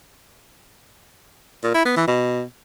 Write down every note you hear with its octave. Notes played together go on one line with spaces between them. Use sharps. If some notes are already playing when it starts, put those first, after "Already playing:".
A#2
E4
B3
E3
B2